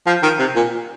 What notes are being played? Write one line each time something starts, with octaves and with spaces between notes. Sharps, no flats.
F3
D#3
C3
A#2